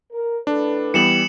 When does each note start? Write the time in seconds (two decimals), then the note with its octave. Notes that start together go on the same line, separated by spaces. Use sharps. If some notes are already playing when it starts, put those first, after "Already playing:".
0.12 A#4
0.47 A2 D4 A4 B4
0.94 E3 G3 B3 C#7 E7 F#7